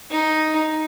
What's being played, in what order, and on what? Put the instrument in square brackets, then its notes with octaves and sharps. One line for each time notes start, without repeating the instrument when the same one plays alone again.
[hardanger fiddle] D#4